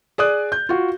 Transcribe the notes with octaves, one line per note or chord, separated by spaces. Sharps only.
G#4 D5 D#6 F#6
G6
F4 F#4